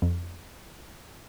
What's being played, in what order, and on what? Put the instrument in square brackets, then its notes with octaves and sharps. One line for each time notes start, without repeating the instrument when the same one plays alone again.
[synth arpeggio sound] F2